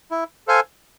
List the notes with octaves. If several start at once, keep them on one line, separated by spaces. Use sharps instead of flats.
E4
A4 C5 F5 G#5